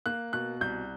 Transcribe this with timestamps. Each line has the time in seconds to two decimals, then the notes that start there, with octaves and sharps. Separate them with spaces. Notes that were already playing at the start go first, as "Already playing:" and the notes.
0.06 A#3 F#6
0.33 B2 F#6
0.61 C2 G6